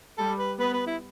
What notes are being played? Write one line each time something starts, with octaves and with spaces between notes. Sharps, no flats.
G3 A4
B4
B3 B4
B4
E4